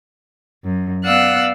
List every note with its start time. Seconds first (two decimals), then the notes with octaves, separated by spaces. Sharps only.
0.64 F#2
1.05 B3 D5 F5 F#5 E6 F#6